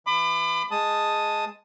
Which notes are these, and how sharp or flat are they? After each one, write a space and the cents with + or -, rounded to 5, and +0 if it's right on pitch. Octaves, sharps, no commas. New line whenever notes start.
E3 +0 B5 +30 D6 +40
G#3 +0 A5 +0 D#6 +0